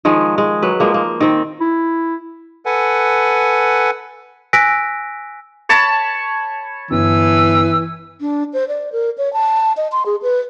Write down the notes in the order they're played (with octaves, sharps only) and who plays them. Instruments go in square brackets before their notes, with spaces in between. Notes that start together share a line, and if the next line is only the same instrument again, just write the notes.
[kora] D#3 F3 G#3
G#3
F#3 B4
F3 G#3 A#3
A#3
D#3 C4
[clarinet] E4
[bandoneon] A4 B4 F#5 G#5
[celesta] G#5 E6 F#6 A#6 B6 D7
[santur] C#5 A5 B5
[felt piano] G1 [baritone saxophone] E3 [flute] E6
[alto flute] D4
C5
D5
A#4
C#5
A5
D#5
C6
G#4
B4